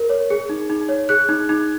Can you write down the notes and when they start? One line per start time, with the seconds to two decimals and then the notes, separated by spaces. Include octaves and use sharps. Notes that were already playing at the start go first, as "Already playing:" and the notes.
Already playing: A#4
0.10 C#5
0.30 G#4
0.49 D#4
0.70 D#4
0.89 C#5
1.09 G#4 F#6
1.29 D#4
1.49 D#4